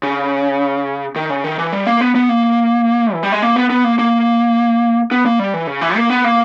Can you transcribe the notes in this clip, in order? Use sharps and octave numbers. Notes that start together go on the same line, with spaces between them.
C#3
D#3
C#3
D#3
E3
G3
A#3
B3
B3
A#3
E3
G3
G#3
A#3
B3
B3
A#3
A#3
B3
A#3
G3
E3
C#3
E3
A#3
B3
A#3